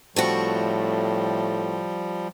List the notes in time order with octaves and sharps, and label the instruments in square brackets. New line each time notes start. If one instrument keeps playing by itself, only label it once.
[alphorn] A2 [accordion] F3 G3 [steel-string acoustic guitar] A3 C4 F#4